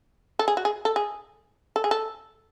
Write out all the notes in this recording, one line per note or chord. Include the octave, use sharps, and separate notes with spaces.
A4
G#4
F#4
G#4
A4
G#4
A4
G#4
A4